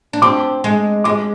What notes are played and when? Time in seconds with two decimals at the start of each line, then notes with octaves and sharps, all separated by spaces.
0.13 D4
0.22 C4 D6
0.64 G#3
1.04 G#3 D6